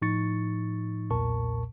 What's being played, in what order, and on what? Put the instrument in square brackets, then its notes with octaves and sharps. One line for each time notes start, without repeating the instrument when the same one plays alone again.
[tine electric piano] A2 F3 D#4 C#6 A6 C#7
B1 E2 A#2 A#4 A5 C#6